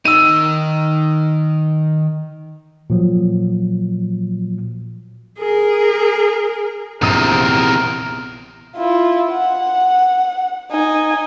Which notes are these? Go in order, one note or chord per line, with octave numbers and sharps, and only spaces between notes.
D#3 D#4 E6 D#7
A#2 F3 F#3
G#4 A#4
A#1 E2 C3 A#4 D#6 D#7
E4 F4
F#5
D#4 G#5